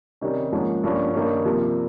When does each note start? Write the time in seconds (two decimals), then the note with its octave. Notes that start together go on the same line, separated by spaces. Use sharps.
0.21 C3 D#3 G3 C#4
0.52 G#2 F3 A#3 C#4
0.84 G2 F3 A#3 C#4
1.14 G2 D#3 A#3 C#4
1.45 C3 F3 A#3